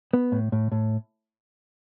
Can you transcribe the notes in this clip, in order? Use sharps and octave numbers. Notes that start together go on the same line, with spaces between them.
B3
A2
A2
A2